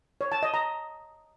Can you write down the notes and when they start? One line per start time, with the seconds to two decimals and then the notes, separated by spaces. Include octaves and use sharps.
0.21 C#5
0.32 A5
0.43 D#5
0.54 A#5